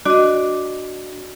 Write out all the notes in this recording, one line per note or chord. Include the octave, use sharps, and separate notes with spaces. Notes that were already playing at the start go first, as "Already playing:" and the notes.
D4 F#4 D#5